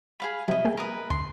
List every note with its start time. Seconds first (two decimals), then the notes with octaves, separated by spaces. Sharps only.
0.20 G#4 F5 B5
0.48 C3 F#3 G3 E4 D#5
0.65 A#3 G#4 G5
0.77 A#4 B4 D#6
1.10 D2 C6